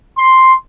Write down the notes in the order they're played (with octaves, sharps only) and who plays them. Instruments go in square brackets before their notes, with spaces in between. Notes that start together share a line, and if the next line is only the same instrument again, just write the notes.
[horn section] C6